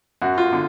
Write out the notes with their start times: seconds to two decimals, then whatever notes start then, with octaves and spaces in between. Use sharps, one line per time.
0.22 F#2 F#4
0.38 F4
0.53 D3